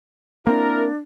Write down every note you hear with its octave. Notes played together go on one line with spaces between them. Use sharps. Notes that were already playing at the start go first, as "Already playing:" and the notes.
A#3 C4 D4 E4 A#4